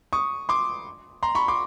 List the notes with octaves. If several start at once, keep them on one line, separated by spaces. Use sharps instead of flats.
C#6 D#6
C6 D6
A#5 C6
B5 C#6
C6 D6